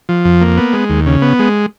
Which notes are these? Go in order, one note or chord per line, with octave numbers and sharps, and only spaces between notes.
F3
F2
A#3
B3
G#3
D#2
C#3
B3
G#3